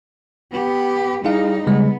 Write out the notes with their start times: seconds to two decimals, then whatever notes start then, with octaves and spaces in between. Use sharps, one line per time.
0.52 B3 G4
1.25 G3 D#4 E4 G#4 F5
1.67 C#3 G3 G#3 B3